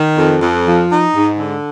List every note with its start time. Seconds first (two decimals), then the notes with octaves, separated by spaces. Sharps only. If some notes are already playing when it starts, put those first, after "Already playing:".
Already playing: D#3
0.16 F2
0.41 F2
0.65 F3
0.90 D#4
1.14 G#2
1.39 D3